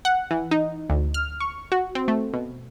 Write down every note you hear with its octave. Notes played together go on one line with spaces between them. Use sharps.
F#5
E3
D#4
D2
F6
C#6
F#4
C4
A3
B2